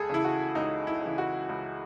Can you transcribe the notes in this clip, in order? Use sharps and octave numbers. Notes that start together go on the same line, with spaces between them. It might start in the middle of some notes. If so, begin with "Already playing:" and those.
Already playing: C#2 G#4 A4
C#3 E3 E4
F#4
C#2 D#4
E4
C#3 E3
F#4
C#2